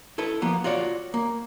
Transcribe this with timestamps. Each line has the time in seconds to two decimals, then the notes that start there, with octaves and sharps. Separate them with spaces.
0.18 E4 A4 B4
0.42 F3 A#3 B3
0.64 F4 F#4 C#5 D5
1.14 A#3